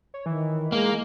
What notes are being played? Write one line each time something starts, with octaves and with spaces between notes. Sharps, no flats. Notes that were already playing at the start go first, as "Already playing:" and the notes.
C#5
D#3 E3
G#3 A#3